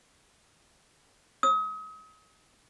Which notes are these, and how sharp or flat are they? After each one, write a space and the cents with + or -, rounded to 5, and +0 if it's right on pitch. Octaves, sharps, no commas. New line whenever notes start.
D#6 +40